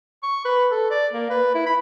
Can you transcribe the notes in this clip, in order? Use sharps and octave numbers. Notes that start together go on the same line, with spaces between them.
C#6
B4
A4
D5
A#3
B4
E4
B5